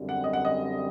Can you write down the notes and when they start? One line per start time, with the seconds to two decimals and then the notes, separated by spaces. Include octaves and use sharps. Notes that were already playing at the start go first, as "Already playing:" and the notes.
Already playing: F#2 D3 G3 C4
0.09 F#5
0.24 D#5
0.33 F#5
0.45 D#5